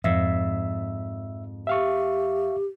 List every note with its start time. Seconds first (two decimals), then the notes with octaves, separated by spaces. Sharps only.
0.04 F2 G#2 E5 E6
1.67 G4 E5 F5 C#6